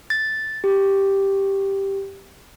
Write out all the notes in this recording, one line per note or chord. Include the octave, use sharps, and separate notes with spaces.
A6
G4